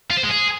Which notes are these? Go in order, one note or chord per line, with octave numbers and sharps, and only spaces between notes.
F4
C5
G#3
G#4